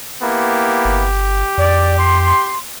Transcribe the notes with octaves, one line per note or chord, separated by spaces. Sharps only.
A#3 B3 E4 G4
G1
F2 D5
C6